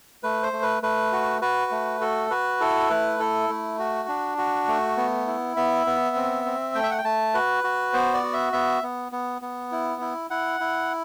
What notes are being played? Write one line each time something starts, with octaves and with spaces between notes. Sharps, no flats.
A3 B4
C5
A3
B4
A3 B4
F#4
F#4 B4
A3
F#4 A4
F#4 B4
E4 A4
A3 B4
E4 A4
A3
F#4
D4
F#4
A3
B3
E4
B3 E5
B3
C4
C4
A3 G5
E5
F#5
G5
A3 A5
F#4 B4
F#4
B3 C5
D5
F#4
E5
B3 E5
B3
B3
B3
E4
E4
E4 F#5
E4